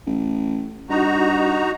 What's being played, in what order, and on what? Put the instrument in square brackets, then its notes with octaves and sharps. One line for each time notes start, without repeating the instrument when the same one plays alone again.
[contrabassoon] A1
[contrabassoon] G2 [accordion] D#4 F#4 A#5